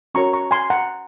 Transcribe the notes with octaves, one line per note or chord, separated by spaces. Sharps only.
C#4 F#4 A#4 C#5 A#5 C#6
A#5 C#6
G#5 C6
F#5 A#5